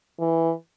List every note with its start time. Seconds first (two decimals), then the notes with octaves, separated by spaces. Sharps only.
0.19 E3